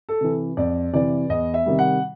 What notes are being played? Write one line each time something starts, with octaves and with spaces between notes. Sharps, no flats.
A4
C3 E3
F2 D5
C3 E3 D5
E2 D#5
E5
C3 D#3 G3
F#5